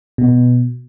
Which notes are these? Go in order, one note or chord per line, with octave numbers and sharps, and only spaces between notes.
B2